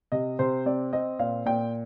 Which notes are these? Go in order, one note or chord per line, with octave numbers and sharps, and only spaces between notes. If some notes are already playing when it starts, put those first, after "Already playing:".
C3 D#5
C3 C5
C4 D5
C4 D#5
A#2 F5
A#2 G5